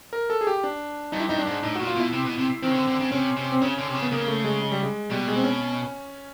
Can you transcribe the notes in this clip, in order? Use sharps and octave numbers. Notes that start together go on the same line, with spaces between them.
A#4
A4
G#4
G4
D4
G2 D#4
E4
G2 D#4
D4
G#2
A2 D#4
A#2 F#4
F4
B2 E4
C3
B2
C3
D#3 C4
C#3
D3
D3
C#3
C3 C#4
C3
C4
C#3 C#4
D3
C3
C#3
B3
C#3 A#3
A3
G#3
G#3
G3
G#3
B2 G3
G#3
C4
C#4